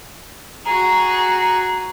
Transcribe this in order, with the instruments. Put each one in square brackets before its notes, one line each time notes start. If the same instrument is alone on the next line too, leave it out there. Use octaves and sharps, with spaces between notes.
[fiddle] F#4 G#4 [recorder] A#5